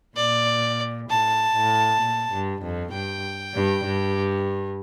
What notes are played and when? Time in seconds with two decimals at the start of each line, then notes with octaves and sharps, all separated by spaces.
0.17 A#2 D5
1.09 A2 A5
1.54 A2
2.01 A#2
2.32 G2
2.62 F2
2.93 G2 G5
3.54 G2
3.85 G2